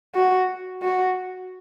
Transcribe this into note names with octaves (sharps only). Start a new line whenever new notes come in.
F#4
F#4